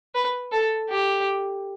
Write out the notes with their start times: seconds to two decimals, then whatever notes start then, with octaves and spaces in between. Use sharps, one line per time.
0.15 B4
0.52 A4
0.89 G4